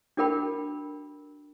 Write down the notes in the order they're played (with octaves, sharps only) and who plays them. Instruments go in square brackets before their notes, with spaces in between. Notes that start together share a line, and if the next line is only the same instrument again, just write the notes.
[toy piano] D4 F#4 A4 A#4 G5 B5